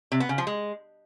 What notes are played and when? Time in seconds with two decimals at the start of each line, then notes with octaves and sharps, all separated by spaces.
0.12 C3
0.20 B3
0.29 C#3
0.38 F3
0.47 G#3